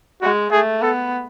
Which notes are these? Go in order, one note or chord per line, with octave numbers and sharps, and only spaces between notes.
G#3 F#4
A3 G#4
B3 A4